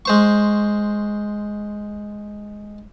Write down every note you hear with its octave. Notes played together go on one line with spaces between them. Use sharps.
G#3 C5 C#6